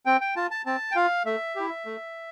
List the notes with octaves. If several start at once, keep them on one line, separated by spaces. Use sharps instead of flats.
C4 G5
G5
F4 A5
A5
C4 A5
G5
F4 F5
A3 E5
E4 G4
A3